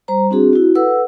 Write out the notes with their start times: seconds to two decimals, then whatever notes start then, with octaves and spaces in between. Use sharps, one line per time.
0.08 G3 C5 A#5
0.31 C4 D4 F#4 G#4
0.53 E4 F#4
0.75 A4 B4 F#5 E6